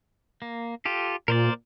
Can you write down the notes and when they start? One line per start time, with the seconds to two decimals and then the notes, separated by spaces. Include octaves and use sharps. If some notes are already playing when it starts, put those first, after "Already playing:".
0.42 A#3
0.85 F4 G4 A4
1.28 A#2 A#4 C5 D5